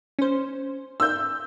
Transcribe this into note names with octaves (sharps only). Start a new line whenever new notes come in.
C#4 C5
E6 G6